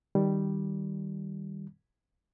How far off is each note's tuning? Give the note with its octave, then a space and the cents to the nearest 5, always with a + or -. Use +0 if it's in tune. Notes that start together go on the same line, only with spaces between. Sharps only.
D#3 +0 G3 +0